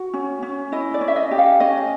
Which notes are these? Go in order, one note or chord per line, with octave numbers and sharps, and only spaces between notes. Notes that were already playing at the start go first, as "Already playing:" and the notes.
Already playing: F#4
C#4
C#4
E4 D#5
D5
C#4
E5
D#5
G4
F5
C#4 D#5